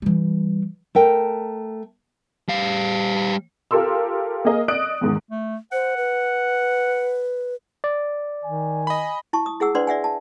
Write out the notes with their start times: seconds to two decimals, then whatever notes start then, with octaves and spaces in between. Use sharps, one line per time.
0.02 E3 G3
0.95 A3 A#4 G5
2.49 G3 F5
3.71 F4 G4 A4 A#4 C6 E6
4.45 A#3 G#4 A#4 D#5
4.68 D5 D#5 D#6 F#6 D7
5.01 E2 G#2 D#3
5.31 A3
5.72 C5 F#5
5.97 B4
7.84 D5
8.44 D#3 G#5
8.87 D#5 B5
9.33 E4 A5 C#6
9.46 D#6
9.60 E4 G#4 F#5 E6
9.75 D4 B4 C5 D5 F#5 C6
9.87 D5 E5 F#5 G#5
10.04 A5